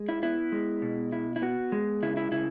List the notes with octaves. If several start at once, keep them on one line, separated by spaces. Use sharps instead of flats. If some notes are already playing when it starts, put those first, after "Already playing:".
Already playing: G#3
E4
B3 E4
G#3
B2
E4
E4
B3 F#4
G#3
C#3 E4
E4
C#3 E4